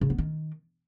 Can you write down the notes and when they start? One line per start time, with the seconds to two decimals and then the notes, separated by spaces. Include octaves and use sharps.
0.01 C#3
0.10 B3
0.18 D#3